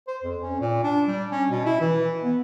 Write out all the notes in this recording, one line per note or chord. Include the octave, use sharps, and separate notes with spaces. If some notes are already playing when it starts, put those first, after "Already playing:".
C5
F2
C#4
A#2
D4
G3
C#4
B2
E4
E3
B3